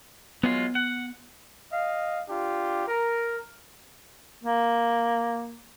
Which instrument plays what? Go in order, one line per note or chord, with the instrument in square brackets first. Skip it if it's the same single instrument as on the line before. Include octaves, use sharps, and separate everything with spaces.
[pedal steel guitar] F#3 G#3 F4 [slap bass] B3
[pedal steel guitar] F#5
[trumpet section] D#5 F5
D4 F4 G4
A#4
[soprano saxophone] A#3